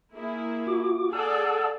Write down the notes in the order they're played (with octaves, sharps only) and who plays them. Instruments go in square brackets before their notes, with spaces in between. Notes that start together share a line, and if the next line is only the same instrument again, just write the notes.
[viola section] A#3 E4 G#4
[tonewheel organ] F4 F#4 D6
[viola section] G#4 A4 D5 [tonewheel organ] F#5 A5 E6